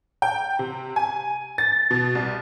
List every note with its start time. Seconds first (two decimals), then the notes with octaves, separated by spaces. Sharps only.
0.22 G5
0.59 C3
0.96 G#5
1.58 A6
1.91 B2
2.15 C2